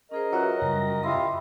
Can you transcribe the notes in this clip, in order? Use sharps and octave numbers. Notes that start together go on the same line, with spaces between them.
C#4 G#4 A#4 C5 D#5
F#3 F4 F#4 B4 C#5 E5 F#5
F#2 C#3 G3 A#6
E4 F4 G4 D#5 F5 B5 C6